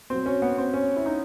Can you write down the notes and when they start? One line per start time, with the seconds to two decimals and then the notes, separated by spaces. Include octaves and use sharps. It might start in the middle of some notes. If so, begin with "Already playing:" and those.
0.10 B2 F#3 C4
0.26 C#4
0.42 B3
0.58 C4
0.74 C#4
0.96 E4
1.06 D#4